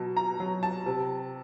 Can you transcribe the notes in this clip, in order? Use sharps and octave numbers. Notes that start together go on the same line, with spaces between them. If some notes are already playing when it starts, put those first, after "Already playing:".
Already playing: B2 F#3 A5
A#5
F#3
A5
C3